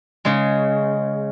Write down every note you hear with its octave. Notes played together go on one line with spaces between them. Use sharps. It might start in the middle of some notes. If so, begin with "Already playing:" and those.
C#3 G#3